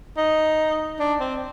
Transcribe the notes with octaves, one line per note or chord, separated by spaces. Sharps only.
D#4
D4
C4